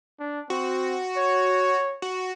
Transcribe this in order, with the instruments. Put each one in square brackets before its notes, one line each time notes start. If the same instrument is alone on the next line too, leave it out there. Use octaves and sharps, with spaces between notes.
[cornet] D4
[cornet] C4 [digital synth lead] F#4
[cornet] C#5
[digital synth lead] F#4